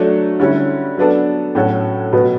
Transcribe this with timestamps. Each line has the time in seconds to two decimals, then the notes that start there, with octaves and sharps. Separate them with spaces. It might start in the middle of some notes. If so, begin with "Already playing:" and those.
Already playing: F#3 A3 D4
0.40 D3 G3 C#4 E4
0.98 F#3 B3 D4 A4
1.55 A2 F#3 C#4 F#4 A4
2.13 B2 F#3 B3